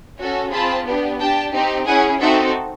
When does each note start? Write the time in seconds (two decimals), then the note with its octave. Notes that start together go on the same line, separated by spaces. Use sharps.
0.20 C#4 F#4 A4
0.52 C4 F4 G#4 A5 B5
0.86 B3 D4 G4
1.20 D4 G4 G5 A5
1.53 C4 D#4 G4
1.87 C#4 E4 G#4 F#5 G#5
2.20 C4 D#4 F#4 A4 E5 F#5